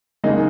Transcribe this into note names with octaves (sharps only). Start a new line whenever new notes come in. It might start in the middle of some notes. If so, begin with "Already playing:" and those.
C#3 G#3 A#3 D#4